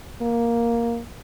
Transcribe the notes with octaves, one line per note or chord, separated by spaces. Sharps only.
A#3